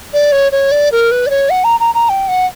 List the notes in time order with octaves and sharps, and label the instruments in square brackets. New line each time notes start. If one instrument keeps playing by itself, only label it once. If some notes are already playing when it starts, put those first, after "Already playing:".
[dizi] D5
C#5
C#5
D5
A#4
B4
D5
C#5
F#5
A#5
A#5
A#5
G5
F#5